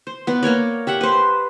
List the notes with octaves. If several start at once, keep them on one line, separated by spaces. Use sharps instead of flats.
C5
B3 B4 D5
A#3 A#4 C#5 D5
G4 E5 F#5
B4 C5